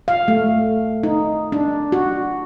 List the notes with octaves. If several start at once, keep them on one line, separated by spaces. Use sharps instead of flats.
F5
A3
D#4
D4
F#4